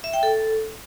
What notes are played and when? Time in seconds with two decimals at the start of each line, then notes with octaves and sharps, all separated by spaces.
0.04 E5
0.13 G5
0.23 A4